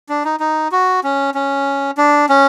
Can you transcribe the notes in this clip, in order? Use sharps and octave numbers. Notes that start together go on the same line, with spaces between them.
D4
D#4
D#4
F#4
C#4
C#4
D4
C#4